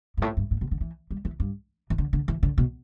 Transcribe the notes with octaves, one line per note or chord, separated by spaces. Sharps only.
G2
A2
G2
A2
B2
D3
E3
G3
E3
G2
E3
D3
D3
E3
D3
B2